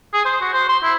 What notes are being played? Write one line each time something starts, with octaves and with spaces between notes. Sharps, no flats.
G#4
C5
F#4
C5
C6
E4